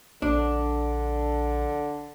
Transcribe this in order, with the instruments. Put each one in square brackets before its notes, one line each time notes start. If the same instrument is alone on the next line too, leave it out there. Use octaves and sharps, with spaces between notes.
[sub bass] A#1 [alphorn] D3 [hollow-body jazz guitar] D4